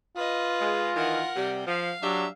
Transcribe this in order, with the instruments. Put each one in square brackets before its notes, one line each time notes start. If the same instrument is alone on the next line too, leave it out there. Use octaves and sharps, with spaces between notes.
[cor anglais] F4 [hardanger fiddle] B4 D#5
[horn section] G#3
[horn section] D#3 E3 [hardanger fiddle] A#4 F#5
[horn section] C3 G3
[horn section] F3 [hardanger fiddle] F5
[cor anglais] F#3 [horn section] D4 G4 E5